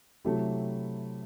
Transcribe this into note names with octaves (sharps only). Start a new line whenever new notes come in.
C3 F#3 A3 E4 G4